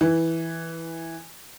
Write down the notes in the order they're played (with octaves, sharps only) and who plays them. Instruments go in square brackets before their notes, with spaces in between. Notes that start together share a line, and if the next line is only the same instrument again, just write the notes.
[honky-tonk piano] E3